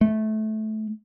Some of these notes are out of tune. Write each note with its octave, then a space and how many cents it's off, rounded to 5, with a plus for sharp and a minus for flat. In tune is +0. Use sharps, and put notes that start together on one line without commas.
A3 -20